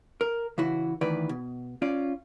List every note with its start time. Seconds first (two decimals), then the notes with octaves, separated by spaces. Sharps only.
0.21 A#4
0.58 C#3 E3 E4 F#4
1.01 D2 D#3 E3 B4 D5
1.29 B2
1.82 C#4 F4 D5